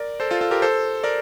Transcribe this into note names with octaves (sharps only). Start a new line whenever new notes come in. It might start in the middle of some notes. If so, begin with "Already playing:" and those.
Already playing: A#4 D5
A4 C5
F4 A4
F4 A4
G4 A#4
A4 C5
A#4 D5